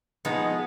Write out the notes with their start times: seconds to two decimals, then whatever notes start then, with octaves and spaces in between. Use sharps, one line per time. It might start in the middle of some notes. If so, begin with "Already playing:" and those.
0.25 F3 G#3 B3 D#4 G#4